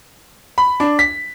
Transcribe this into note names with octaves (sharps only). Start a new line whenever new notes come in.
B5
D4
B6